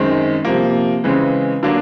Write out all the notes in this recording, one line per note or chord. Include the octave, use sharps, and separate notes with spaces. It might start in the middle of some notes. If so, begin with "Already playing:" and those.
Already playing: F#2 D#3 G#3 C4
C3 F3 A#3
C#3 E3 G#3 C4
D3 F#3 A#3 D4